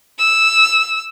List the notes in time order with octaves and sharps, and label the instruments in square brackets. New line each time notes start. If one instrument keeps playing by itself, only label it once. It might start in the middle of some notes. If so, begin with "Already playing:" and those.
[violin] E6